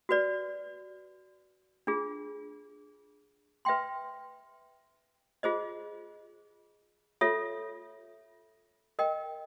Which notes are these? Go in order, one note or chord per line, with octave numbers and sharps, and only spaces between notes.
F#4 B4 D5
D4 F4 G#4
B4 E5 G5 C6
F4 G#4 C5 D#5
F4 A4 C#5 E5
A#4 D#5 G5